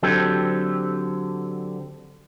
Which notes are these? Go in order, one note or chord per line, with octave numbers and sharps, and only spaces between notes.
D3 F#3 C4 G4 A4